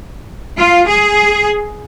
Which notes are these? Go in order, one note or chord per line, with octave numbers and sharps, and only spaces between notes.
F4
G#4